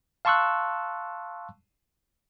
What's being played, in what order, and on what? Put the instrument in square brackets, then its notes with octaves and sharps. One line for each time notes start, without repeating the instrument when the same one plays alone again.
[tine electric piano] F5 A5 C6 C#6 E6 F#6